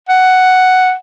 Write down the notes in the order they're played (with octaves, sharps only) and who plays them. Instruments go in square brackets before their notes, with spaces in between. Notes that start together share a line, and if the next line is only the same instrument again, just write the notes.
[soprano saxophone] F#5